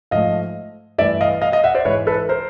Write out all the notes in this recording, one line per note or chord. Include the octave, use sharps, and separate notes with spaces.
G#2 F3 A3 D#5 F5
G2 E3 A3 D5 E5
D#5 F5
D#5 F5
D#5 F5
E5 F#5
C5 D5
G#2 E3 G#3 B4 C#5
A4 B4
A#4 C5